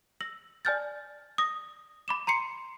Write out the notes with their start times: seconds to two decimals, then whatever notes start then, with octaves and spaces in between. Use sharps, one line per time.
0.21 E6 A#6 F#7
0.65 D5 G#5 A5 F6 G6 A6
1.38 D#6 A#6
2.08 B5 D6 E7
2.27 A#5 C6 C7 C#7